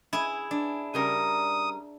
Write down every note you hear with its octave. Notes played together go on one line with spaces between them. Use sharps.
E4 G#4 G#5
D4
C#3 G3 A#4 D#6